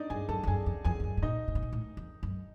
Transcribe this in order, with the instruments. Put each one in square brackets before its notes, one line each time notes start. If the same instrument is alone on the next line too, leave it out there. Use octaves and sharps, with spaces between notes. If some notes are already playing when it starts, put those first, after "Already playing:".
Already playing: [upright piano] D4 D#4 D5 D#5
[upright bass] G2 [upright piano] G#4 G#5
[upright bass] F#2 [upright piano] A4 A5
[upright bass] F2
[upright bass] F#2 [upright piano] G#4 G#5
[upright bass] F2
[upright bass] F2 [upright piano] G#4 G#5
[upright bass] F2
F#2
A2
[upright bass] A#2 [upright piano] D#4 D#5
[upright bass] A#2
B2
A#2
A2
F2
F#2